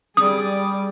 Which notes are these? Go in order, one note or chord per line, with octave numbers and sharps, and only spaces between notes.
G3 G#4 D5 D#6